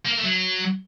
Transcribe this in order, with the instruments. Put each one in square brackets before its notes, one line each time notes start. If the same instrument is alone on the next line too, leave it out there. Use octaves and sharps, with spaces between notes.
[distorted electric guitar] A#3
A#4
A3
F#3